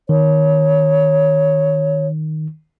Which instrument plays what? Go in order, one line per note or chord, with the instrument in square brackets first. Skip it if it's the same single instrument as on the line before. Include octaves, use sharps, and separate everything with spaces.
[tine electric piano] D#3 [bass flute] C#5